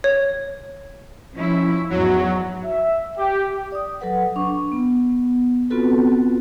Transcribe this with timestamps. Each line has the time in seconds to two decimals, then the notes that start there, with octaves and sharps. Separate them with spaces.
0.04 C#5
1.34 F3 C#4 E4
1.90 E2 G#2 F#3
2.65 E5
3.18 G4
3.72 D5 D#6
4.01 F#3 A4 B4 F#5
4.36 D4 C#6
4.72 B3
5.70 B3 C4 F4 F#4 A4 B4